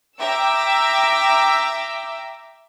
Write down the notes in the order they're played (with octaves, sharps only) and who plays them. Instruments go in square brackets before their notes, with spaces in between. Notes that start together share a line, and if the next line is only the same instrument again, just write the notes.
[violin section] E5 G5 A#5 D6 E6